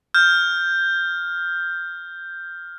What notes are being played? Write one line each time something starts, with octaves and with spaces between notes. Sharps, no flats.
F6 G6